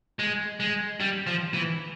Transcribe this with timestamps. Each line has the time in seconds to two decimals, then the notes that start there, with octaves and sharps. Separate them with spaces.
0.19 G#3
0.60 G#3
1.00 G3
1.27 F3
1.54 E3